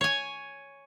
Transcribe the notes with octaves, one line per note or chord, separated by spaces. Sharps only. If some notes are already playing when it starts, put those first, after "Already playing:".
C#5 G#5